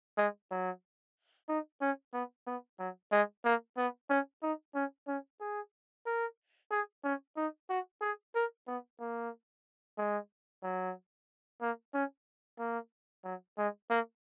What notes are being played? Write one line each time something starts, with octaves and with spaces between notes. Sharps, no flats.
G#3
F#3
D#4
C#4
B3
B3
F#3
G#3
A#3
B3
C#4
D#4
C#4
C#4
G#4
A#4
G#4
C#4
D#4
F#4
G#4
A#4
B3
A#3
G#3
F#3
A#3
C#4
A#3
F#3
G#3
A#3